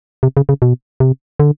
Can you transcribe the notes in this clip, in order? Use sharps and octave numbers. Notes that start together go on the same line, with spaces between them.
C3
C#3
C#3
B2
C3
D3